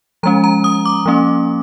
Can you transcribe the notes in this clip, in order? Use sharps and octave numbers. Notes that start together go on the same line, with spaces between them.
F3 G#3 C#4 A#5
A#5
D#6
D6
F3 A#3 C#4